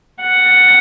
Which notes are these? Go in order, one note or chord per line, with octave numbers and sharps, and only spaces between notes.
F#5